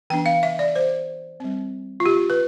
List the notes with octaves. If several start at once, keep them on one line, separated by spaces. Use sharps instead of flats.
E3 B3 D4 G5
F5
E5
D5
C5
G3 C4
F4
G4
B4